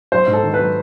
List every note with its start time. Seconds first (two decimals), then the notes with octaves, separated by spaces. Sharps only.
0.12 F#3 C5
0.27 G#2
0.33 A4
0.44 D#3
0.54 B4
0.60 F#3